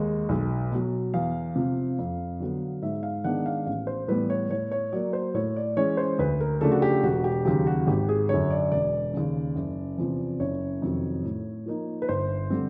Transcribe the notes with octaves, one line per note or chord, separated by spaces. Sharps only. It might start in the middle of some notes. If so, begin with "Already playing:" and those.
Already playing: D#2 D#3 G#3
B1
B2 F#3
E2 F5
C3 F3
F2
D3 F#3 B3
G#2 E5
F5
D#3 G#3 B3 D4 F#5
F5
A1 F5
C5
A2 E3 G3 B3 B4
C#5
A2 C#5
C#5
F#3 A#3 D5
C5
A2 C#5
D5
E3 G#3 C#4 C#5
C5
D2 B4
A#4
C#3 F3 A3 D4 A4
F#4
G4
E1 F#4
G4
D#2 C#3 F#3 G4
F#4
G#1 G4
G#4
F#2 D3 C#5
D5
E1 D5
D#2 C#3
F#1
E2 C3 F3
F#1 C#5
F2 C3 D#3 F#3
A2
F3 A#3 D#4
B4
G1 C5
D3 G3 C4